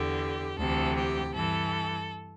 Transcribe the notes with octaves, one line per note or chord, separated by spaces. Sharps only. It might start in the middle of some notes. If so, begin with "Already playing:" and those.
Already playing: E2 D3 G4
D2 C3 E3 A4
G4
G2 E3 A4